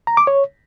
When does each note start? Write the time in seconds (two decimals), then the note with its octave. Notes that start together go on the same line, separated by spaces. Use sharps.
0.07 A#5
0.17 D6
0.27 C#5